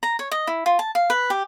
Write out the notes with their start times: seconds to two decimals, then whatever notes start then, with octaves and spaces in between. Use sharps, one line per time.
0.03 A#5
0.19 C#5
0.32 D#5
0.47 E4
0.66 F4
0.79 A5
0.95 F5
1.10 B4
1.30 G4